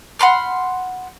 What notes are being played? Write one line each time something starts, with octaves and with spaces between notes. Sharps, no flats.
F#5 B5 C6 F6